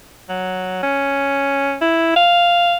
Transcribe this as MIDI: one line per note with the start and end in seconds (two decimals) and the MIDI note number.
0.30 0.79 54
0.83 1.76 61
1.81 2.15 64
2.16 2.77 77